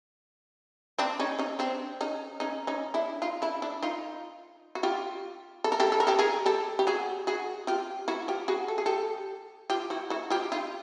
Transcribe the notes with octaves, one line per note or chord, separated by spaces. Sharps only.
C4 D4
C#4 D#4
C#4 D#4
C4 D4
C#4 D#4
C#4 D#4
C#4 D#4
D4 E4
D#4 F4
D4 E4
D4 E4
D#4 F4
F#4
F4 G4
A4
A#4
G4 A4
A4
A#4
G4 A4
G#4 A#4
G4 A4
G4
F#4 G#4
F#4 G#4
F4 G4
E4 F#4
F4 G4
F#4 G#4
A4
G#4
G4 A4
F4 G4
E4 F#4
E4 F#4
F4 G4
D#4 F4